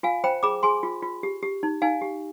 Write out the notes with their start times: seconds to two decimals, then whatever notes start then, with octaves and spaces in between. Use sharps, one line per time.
0.03 F4 F5 G#5
0.24 C5 G5 B5
0.43 G#4 B5 D6
0.63 G#4 G#5 C6
0.83 F4
1.02 F4
1.23 G4
1.42 G4
1.63 D#4
1.82 D#4 F5 G#5
2.01 G4